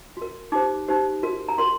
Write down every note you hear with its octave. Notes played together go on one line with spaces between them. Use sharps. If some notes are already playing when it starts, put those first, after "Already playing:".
F#4 A#4
D#4 G4 C5 D6
D#4 G4 C5
F#4 A#4
A#5
F#4 A#4 C6